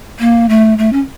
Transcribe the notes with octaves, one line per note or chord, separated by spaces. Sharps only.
A#3
A3
A3
C#4